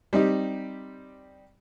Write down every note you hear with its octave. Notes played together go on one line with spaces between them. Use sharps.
G3 C4 D#4 G4